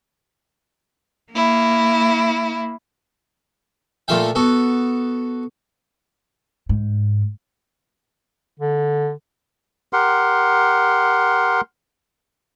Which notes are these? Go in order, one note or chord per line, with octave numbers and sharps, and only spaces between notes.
A#3 E4
A#2 A3 F4 E5 F5 G5
B3 F#4 A4
G#2
D3
G4 A#4 F#5 C6